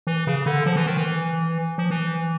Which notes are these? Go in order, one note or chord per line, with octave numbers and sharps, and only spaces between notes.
E3
C#3
D3
F3
E3
D#3
E3
F3
E3